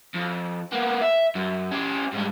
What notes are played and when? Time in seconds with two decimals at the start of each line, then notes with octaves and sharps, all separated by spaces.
0.14 F2
0.72 A#3 B3
1.01 E5
1.35 F#2
1.72 C#4 G4
2.13 G#2 G3